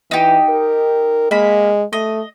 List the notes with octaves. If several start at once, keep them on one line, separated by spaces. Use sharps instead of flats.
E3 D#4 G4
A#4
G#3 A#3 B5
A3 D#5